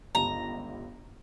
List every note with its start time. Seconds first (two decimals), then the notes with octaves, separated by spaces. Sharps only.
0.15 G1 C#2 G4 A#5